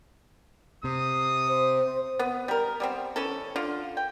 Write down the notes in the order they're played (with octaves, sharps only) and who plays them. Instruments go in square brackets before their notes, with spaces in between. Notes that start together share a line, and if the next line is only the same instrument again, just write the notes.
[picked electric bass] C3 [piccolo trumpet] D#6
[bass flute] C5
[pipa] B3
G3 A#4
G3 B3 C4
E3 C#4 A4
D3 F4
G5